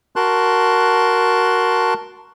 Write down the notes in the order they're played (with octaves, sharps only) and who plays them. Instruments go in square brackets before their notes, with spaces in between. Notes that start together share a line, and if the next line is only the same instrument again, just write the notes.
[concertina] F#4 A#4 A5 C6 F#6